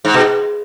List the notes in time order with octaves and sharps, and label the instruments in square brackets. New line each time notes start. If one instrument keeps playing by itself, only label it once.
[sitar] G#2
B2